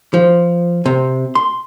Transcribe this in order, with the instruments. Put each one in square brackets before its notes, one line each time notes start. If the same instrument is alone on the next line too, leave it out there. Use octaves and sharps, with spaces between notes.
[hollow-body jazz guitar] F3
C3
C6